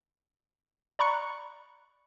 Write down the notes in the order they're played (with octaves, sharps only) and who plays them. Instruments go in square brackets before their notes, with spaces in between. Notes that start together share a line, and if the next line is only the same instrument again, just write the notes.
[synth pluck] D5 A#5 B5 C#6 F#6 C#7